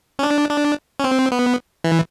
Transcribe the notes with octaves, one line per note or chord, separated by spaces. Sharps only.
C#4
D4
D4
C#4
C4
B3
E3